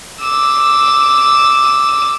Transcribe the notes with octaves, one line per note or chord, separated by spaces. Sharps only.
D6 E6